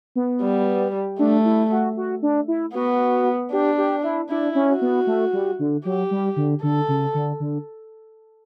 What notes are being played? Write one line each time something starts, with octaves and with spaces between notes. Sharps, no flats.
B3
G3
A3 D4
E4
F#4
F#4
D4
E4
B3 F#4
D4 G4
G4
E4
D4 E4
C#4
F#4
B3
A3
G3
D3
F#3 G4
G3
D3
D3 A4
C#3
D3
D3